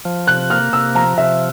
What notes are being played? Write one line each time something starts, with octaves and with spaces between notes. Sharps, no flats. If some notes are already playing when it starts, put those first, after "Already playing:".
F3
C3 F#6
A#3 F6
C3 E6
F3 A#5
C3 E5